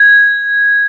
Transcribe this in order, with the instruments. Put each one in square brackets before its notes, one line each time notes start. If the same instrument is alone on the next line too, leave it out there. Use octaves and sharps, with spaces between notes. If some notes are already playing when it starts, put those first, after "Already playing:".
Already playing: [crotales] G#6